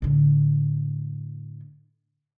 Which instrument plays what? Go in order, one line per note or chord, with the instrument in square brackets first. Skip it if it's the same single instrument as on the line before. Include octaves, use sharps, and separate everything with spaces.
[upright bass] A2 D3